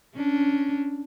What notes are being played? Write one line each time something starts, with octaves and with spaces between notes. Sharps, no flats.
C#4 D4